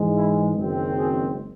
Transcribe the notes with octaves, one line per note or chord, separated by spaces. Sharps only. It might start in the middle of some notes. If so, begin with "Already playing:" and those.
Already playing: G#2 E3 G#3
E4
F#1 F#2 D#3 G#3 C4
G#4